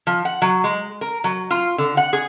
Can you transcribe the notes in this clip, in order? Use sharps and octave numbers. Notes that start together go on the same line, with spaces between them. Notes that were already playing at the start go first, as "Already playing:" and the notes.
F3
F#5
F#3
G#3
A#4
F#3
F4
D3
F#5
G#4